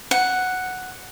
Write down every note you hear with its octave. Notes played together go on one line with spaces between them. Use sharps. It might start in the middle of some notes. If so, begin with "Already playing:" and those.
F#5